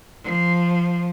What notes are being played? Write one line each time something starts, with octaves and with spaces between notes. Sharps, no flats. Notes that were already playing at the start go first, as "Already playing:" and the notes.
F3